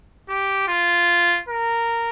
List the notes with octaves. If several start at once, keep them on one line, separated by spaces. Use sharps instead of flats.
G4
F4
A#4